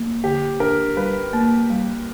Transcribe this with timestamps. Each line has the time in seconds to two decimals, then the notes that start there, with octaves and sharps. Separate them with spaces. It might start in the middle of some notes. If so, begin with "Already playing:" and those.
Already playing: A#3
0.23 D3 G4
0.60 D4 A#4
0.97 G3 B4
1.33 A#3
1.70 G3